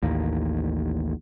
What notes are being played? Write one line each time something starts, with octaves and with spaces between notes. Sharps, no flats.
A1 D#2 A#3